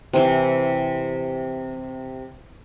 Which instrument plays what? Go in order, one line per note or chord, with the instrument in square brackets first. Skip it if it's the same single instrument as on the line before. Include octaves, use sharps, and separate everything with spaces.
[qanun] C3 E3